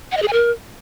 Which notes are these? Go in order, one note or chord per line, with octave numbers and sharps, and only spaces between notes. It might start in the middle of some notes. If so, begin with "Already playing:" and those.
F#5
D#5
G#4
G#5
A#4